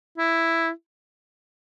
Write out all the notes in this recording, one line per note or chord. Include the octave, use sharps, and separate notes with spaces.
E4